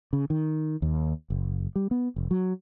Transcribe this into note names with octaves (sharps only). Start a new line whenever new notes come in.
C#3
D#3
D#2
F#1
G3
B3
F1
F#3